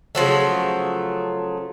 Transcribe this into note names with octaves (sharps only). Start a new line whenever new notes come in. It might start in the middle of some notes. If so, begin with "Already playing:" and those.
C#3 F3 F#3 A3